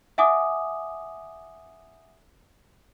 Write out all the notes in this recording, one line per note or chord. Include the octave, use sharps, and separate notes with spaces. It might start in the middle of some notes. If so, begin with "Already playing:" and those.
E5 F#5 G#5 D6 D#6